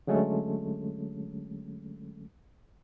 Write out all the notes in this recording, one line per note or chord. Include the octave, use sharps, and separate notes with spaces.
D3 F#3 G#3 A3 C#4 A4